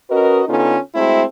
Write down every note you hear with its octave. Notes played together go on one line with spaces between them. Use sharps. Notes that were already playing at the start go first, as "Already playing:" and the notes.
C#4 F#4 A#4 B4 D#5
D3 B3 C#4 D#4 F4 A4
G#3 A3 C4 E4 F#4 A4